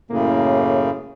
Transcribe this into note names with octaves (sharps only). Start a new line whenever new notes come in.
F#2 A2 C#3 A#3